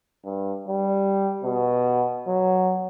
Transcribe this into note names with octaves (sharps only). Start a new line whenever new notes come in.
G2
G3
B2
F#3